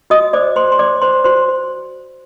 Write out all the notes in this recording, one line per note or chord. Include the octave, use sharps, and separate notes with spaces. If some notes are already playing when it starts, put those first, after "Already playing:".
F#4 D#5 D#6
C5 D5 D6
C5 C6
C6
C5 D5 D6
C5 C6
F#4 C5 C6
C5